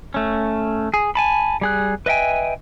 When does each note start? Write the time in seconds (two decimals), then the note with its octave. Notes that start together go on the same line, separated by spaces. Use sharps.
0.14 A3 C#4
0.94 G#4
1.15 G#5 A5 B5
1.61 G3 G#4 F#6
2.06 B4 D#5 E5 G5 G#5